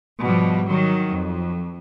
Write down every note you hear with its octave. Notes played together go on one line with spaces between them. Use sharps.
G#2 B2 F3 G3
D#3 F#3
F2